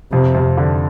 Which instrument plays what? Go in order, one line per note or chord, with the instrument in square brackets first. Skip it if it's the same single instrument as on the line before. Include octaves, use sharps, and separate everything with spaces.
[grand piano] F2 [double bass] C3
[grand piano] F2
D3